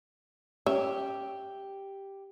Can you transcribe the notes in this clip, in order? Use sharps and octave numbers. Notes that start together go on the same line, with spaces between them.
C#4 G4 E5